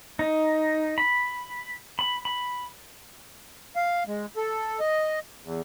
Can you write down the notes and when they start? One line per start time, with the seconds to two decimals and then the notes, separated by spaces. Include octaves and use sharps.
0.19 D#4
0.98 B5
1.99 B5
2.25 B5
3.76 F5
4.07 G#3
4.36 A4
4.80 D#5
5.44 E2